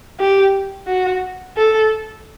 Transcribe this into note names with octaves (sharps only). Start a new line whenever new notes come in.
G4
F#4
A4